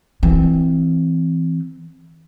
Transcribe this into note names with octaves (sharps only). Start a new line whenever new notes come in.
E3 C4